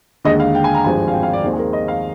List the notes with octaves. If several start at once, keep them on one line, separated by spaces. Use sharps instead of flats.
D#2 D3 G#3 D#5
F5
G5
G#5
A#5
G#1 G2 F3 G#3 C4 G#5
F5
G5
F5
D5
D#2 D#3 G#3 C4
G#4
A#4
D#5
F5